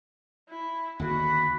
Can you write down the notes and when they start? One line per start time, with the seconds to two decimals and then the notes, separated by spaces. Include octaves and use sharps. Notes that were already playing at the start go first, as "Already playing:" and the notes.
0.49 E4
0.99 D#2 D3 F#4 B5